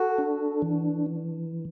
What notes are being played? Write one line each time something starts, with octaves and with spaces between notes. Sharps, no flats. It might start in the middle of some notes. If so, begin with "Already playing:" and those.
Already playing: F#4 A4
D4
E3